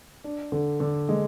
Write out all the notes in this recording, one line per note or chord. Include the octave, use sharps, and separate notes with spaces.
D4
D3
D3
G#3